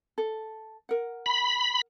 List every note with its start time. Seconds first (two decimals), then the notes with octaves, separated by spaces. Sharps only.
0.18 A4
0.89 A#4 F#5
1.26 B5